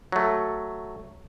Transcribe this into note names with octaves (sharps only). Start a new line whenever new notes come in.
F#3 A3